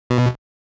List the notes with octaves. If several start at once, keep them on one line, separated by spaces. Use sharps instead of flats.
B2